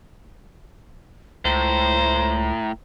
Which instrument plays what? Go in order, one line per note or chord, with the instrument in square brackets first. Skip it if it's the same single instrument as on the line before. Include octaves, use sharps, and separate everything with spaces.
[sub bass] C#2 [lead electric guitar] A2 [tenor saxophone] C5 [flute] A#5